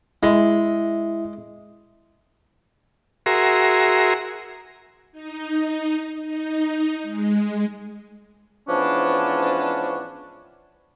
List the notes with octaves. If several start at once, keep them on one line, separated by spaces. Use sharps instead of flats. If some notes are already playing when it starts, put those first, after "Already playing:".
G#3 E4 E5
F#4 G#4 A#4 E5 A#5 C6
D#4
D#4
G#3
G#2 E3 F3 B3 C#4 D4